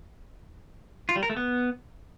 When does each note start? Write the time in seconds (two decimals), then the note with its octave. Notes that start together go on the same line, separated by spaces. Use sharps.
1.09 F4
1.16 G3
1.23 A#4
1.30 A3
1.37 B3